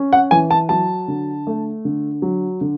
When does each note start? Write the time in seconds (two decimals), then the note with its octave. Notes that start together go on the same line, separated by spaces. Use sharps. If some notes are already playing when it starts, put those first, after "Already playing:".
Already playing: C#4
0.13 F#5
0.31 E3 G#5
0.51 A5
0.69 F#3 A5
1.08 D3
1.47 A3
1.85 D3
2.22 F#3
2.61 D3